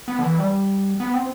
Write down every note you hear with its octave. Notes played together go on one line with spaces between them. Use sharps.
B3
D3
E3
G3
B3
C4